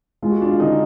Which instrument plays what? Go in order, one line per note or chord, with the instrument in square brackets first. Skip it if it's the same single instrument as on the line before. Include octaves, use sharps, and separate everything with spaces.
[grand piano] G#3 [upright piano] F4
[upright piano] F#4
D4 F4
F4
[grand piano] D3 [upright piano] D#4